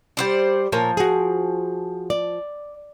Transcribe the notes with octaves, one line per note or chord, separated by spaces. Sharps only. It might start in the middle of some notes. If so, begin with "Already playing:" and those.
G3 C5 D5
A#2 F3 A#4 C#5
F#4 G#4
D5